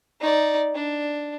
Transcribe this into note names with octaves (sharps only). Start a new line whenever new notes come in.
D#4 D5
D4